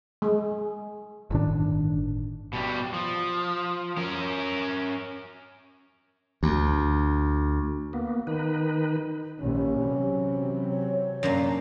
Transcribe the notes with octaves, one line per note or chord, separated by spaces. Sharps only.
G#3
G1 A2 D#3 D4
B2 G3
F3
C#4 A#4
D2
A#3 B3
D#3 D#4 B4
A#1 A#2 D#3 C#4 G4
C3 E3 F#3
C#5
F#2 A#2 A#3 D4